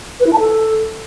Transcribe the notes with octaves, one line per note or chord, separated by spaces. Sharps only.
B4
E4
A5
A4